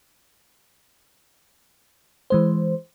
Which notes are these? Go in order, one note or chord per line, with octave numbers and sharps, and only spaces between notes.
E3 G#3 C5